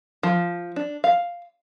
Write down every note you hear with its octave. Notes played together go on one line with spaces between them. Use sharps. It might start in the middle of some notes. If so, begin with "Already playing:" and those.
F3
D4
F5